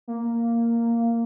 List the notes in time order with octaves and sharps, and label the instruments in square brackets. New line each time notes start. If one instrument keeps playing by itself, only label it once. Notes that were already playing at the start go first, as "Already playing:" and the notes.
[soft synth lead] A#3